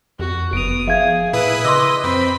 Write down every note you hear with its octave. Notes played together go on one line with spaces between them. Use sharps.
F2 F#4
F#1 B3 D#6 D7 F7
F3 G#4 E5 F5 G#6
A#2 E4 B4 D#6
C#3 B4 D#5 C6 D6 E6
F#2 C4 B5